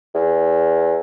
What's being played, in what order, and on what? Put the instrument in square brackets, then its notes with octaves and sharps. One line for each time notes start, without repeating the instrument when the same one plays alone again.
[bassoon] E2